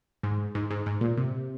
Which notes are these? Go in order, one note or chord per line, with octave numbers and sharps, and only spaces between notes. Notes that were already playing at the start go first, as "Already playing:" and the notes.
G#2
G#2
G#2
G#2
A#2
C3